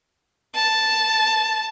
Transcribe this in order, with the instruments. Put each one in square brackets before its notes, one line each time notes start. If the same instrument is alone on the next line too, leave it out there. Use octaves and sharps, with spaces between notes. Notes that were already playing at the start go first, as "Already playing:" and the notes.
[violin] A5